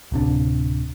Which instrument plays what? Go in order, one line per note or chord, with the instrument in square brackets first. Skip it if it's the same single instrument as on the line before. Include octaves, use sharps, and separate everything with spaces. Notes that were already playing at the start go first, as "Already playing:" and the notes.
[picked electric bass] D1 C3 D4